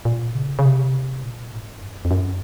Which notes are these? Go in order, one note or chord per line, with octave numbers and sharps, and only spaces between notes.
A#2
C#3
C#3
C3
A#2
G#2
F#2
F2
F#2